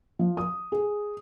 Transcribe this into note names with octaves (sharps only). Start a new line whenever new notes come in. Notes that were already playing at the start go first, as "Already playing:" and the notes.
F3
D#6
G#4